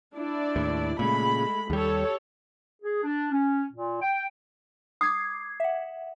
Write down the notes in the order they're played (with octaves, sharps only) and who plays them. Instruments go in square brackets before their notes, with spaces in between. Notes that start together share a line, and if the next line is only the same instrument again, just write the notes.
[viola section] D4 E4 D5
[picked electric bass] D#2 A2
[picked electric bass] A#2 C#3 [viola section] G#3 A3 B5
[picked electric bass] D#2 G3 [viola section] G4 A4 C#5
[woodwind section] G#4
D4
C#4
A#2
G5
[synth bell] D6 G#6 C7 [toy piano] D#6
[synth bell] E5 F#5